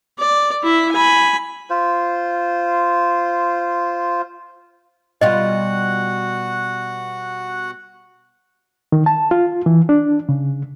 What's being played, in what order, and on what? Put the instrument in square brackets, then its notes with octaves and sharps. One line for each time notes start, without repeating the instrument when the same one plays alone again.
[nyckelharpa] D5
E4 E5
G#5 B5
[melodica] F4 C5
[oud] B2 G3 F4 [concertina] F#4 F#5 [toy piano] D#5
[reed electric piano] D#3
A5
F4
E3
D4
C#3